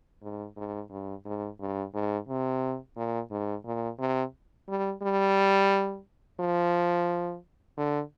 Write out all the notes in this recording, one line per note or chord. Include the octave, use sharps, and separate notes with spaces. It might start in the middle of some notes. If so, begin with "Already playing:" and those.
G#2
G#2
G2
G#2
G2
G#2
C3
A#2
G#2
A#2
C3
G3
G3
F3
D3